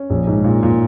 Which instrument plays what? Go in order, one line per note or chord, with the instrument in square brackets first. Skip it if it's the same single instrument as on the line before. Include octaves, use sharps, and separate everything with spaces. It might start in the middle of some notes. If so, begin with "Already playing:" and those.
Already playing: [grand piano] C#4
A#1
G#2
A#2
A#2